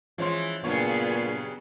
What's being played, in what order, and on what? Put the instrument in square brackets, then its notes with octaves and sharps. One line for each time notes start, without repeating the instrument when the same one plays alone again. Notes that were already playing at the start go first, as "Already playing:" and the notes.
[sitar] E3 G#3 [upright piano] F3 C#4 C6
[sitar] G2 C#3 F#3 [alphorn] A#2 [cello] B3 G#4 [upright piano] C#5